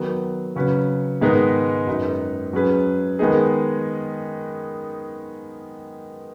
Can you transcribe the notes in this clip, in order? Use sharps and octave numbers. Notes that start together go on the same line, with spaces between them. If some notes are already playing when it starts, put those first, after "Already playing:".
Already playing: D#3 F#3 B3 D#4
C#3 F#3 C#4 B4
G#2 D#3 G#3 B3 D#4
F#2 F#3 D#4 G#4 B4
F#3 C#4 G#4 B4
D#3 G#3 B3 D#4 G#4